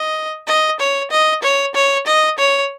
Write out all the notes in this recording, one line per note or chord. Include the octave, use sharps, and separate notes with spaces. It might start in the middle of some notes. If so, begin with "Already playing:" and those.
Already playing: D#5
D#5
C#5
D#5
C#5
C#5
D#5
C#5